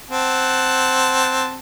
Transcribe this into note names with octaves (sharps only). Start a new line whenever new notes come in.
C4 F#5 A5